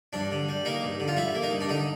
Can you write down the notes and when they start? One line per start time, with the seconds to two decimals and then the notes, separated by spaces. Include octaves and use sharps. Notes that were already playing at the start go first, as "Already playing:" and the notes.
0.13 G2 D4
0.31 D3
0.49 G3
0.65 A#3 D#4
0.82 G2
1.00 D3
1.08 F4
1.17 G3 E4
1.34 A#3
1.43 D#4
1.51 G2
1.61 D4
1.69 D3 D#4